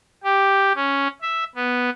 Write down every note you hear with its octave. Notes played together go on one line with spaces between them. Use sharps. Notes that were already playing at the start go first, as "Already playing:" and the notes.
G4
C#4
E5
B3